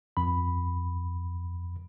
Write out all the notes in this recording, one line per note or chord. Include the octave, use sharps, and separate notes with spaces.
F2 B5